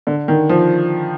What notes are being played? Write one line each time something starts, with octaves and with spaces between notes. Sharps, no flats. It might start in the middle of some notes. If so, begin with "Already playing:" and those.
D3
D#3
F3